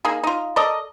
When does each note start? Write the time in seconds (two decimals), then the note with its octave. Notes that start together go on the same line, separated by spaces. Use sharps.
0.05 A#3 D#4 G#4
0.24 D#4 F4
0.56 A4 A#4 D5 D#5